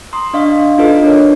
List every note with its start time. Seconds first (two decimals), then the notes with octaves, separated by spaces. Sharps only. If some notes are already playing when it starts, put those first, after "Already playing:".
0.13 A#5 C6 D#6
0.33 D4 D#5 F5 C#6
0.78 D4 D#4 F4 A4 B4 D#5
1.03 D4 A#4 C#5